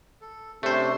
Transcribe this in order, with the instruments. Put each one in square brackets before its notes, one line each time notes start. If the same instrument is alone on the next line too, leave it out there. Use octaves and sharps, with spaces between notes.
[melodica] A4
[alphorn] C3 [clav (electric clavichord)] A3 C5 [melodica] C#4 D4